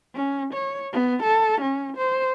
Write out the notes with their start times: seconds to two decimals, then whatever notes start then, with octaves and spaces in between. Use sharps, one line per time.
0.15 C#4
0.54 C#5
0.93 B3
1.23 A4
1.61 C#4
1.97 C5